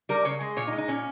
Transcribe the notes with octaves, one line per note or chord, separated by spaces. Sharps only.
G3 A#4
C#3 C#5
G#3
A#2 C#5
D#4
G#3
D#4
A#2 C#4